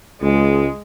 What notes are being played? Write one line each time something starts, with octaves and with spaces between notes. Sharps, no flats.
C#2 G#3